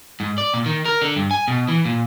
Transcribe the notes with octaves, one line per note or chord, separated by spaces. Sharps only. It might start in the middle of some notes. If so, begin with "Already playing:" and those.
G#2
D5
A#2
D#3
A#4
D3
G2
G#5
B2
E3
A#2